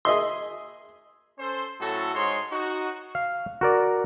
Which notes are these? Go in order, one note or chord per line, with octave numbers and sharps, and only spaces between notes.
G#4 D#5 E5 C6
C#4 A4 C5
A2 F#3 C#4 F#4 A4
G#2 C#5 D#5 C6
D#4 F#4
F5
F#4 A#4 D5